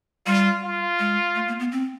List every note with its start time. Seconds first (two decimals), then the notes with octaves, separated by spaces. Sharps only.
0.26 G3 F4
0.63 F4
0.99 G#3
1.35 A3
1.48 A#3
1.60 B3
1.72 C4